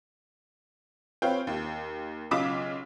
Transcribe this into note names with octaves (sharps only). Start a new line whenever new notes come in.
C4 F4 B4 C#5 F5 G5
D#2
B1 C#3 F4 D6 B6 E7